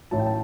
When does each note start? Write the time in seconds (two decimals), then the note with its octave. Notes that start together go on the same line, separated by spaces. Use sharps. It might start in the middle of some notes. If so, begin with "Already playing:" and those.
0.11 A1 A2 F#3 A5
0.19 G5
0.26 A5